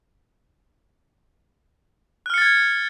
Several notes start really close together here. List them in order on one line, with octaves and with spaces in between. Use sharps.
F#6 F6 C#7 A6 G#6